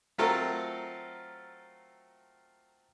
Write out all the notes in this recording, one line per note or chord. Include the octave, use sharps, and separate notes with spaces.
F#3 A3 C4 F4 A4 A#4